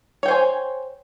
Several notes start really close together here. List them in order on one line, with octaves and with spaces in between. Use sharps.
C#5 G5 C5 G#5